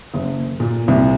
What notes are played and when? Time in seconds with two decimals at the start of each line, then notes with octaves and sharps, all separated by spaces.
0.14 F#1
0.60 A#2
0.88 C2